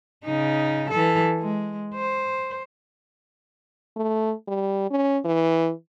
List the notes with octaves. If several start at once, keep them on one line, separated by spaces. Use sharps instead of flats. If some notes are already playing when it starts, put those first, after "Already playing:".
C#3 D#4
E3 A4
G#3
C5
A3
G3
C#4
E3